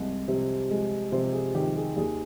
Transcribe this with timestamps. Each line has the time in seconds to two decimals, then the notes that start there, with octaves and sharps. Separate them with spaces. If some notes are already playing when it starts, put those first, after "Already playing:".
Already playing: C2 G#3
0.28 C3
0.69 G#3
1.12 C3 C5
1.33 G#4
1.55 D#3 G4
1.76 G#4
1.96 D#2 G#4